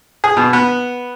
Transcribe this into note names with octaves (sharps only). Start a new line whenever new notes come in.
G#4
B2
B3